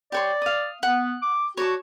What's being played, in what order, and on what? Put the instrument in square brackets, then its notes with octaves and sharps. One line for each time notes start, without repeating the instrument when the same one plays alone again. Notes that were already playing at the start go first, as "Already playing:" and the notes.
[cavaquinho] G4 C#5 C6 [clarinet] D5
[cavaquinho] F5 D#6
[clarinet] B3 [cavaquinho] F#5
[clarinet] D6
[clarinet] F#4 [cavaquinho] C#5 D5 A5